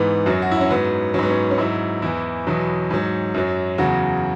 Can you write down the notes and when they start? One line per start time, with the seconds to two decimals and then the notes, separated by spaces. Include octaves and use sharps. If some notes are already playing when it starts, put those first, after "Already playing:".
Already playing: G#2 E3 B3
0.26 F#2 F#3
0.42 F#4
0.51 E4
0.61 C#4
0.70 G#2 F#3 B3
1.14 F#3 C#4
1.19 G#2 B3
1.31 C#4
1.51 C#4
1.58 G#2 F#3 E4
2.02 E2 E3 E4
2.47 E2 B2 F#3
2.91 G#2 F#3
3.34 F#2 F#3
3.78 E2 C#3 F#3 F#4